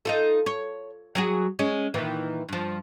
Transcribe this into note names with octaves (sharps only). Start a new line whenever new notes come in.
D#4 F4 A4
C#5
F#3 F#4 G#4
G#3 C#4
A#2 D#3 E3
G2 F3